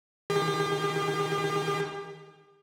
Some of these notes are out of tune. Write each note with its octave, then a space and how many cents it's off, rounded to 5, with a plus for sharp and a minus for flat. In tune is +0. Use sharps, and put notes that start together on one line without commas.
D#3 +0 G4 +40